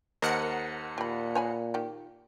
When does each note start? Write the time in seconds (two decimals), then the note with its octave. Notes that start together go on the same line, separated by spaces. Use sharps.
0.22 D#2 A#4 C5 D#5 F#5 C#7
0.98 A#2 G4 B5
1.35 C#5 G#5 B5
1.74 D#3 G4